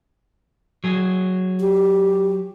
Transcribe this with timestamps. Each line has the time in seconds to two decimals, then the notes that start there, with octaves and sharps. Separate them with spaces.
0.84 F#3 G#4
1.60 G4